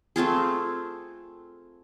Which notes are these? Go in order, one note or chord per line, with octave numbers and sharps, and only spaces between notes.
A3 C4 F4 G#4